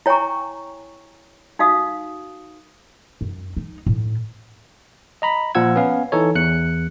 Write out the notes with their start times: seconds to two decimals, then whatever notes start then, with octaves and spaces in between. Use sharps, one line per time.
0.06 E4 C#5 G5 G#5 A#5 C#6
1.59 D#4 F#4 F5 D#6
3.21 F#2
3.57 D#4
3.86 A2
5.22 D#5 A#5 B5
5.55 A#2 F3 F4 F#5 E6 G#6
5.76 B3 C#4 B4 F5
6.12 E3 D#4 A4 C#5
6.35 E2 F#6 C#7